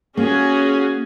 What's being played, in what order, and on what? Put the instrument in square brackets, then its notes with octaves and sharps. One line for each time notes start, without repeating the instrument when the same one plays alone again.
[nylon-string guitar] A#3 [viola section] C#4 F#4 G#4